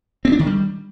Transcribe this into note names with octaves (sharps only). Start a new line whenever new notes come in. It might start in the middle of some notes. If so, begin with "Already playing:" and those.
C4
D4
D#3
G3